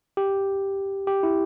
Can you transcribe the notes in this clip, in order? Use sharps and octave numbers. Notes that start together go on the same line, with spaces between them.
G4
G4
E4